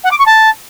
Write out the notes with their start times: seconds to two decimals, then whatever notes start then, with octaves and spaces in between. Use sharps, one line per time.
0.04 F#5
0.11 D6
0.19 C#6
0.26 A5